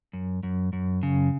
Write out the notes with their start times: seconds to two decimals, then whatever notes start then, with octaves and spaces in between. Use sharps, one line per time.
0.13 F#2
0.43 F#2
0.73 F#2
1.03 C#3